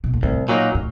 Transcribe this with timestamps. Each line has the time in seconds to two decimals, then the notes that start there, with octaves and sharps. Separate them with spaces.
0.04 B2
0.14 A#2
0.23 C2 A2
0.49 A#2 F#3 A#3 D#4
0.75 A2